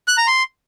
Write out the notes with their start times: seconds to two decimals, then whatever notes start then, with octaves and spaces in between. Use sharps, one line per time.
0.08 F#6
0.18 A#5
0.27 C6